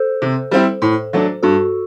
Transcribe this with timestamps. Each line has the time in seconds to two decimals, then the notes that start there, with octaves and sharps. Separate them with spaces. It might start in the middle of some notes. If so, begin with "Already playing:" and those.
Already playing: A4 C5
0.22 C3
0.51 G3 C4 E4
0.82 A2
1.13 F#3 A3 D4
1.43 G2 F#4 A4